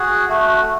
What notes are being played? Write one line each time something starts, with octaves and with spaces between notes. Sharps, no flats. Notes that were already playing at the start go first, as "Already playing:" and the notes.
Already playing: F#4 G#4
A3 F#4
A3